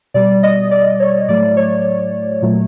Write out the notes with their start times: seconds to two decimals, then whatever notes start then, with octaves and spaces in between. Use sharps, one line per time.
0.14 B2 G3 D5
0.43 D#5
0.71 D5
1.00 C#5
1.28 A2 F#3 A3 D5
1.57 C#5
2.42 A#2 F#3 A3